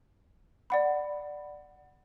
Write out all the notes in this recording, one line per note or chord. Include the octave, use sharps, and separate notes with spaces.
D5 F#5 B5